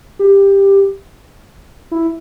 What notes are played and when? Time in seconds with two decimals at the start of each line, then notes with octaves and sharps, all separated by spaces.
0.19 G4
1.91 E4